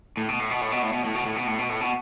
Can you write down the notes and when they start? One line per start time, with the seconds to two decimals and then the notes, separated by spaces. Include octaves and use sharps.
0.17 A2
0.29 B2
0.40 A2
0.51 B2
0.61 A2
0.72 B2
0.82 A2
0.93 B2
1.05 A2
1.15 B2
1.26 A2
1.36 B2
1.47 A2
1.59 B2
1.70 A2
1.81 B2